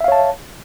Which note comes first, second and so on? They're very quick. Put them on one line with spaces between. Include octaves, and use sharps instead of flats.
E5 F5 C#5 A5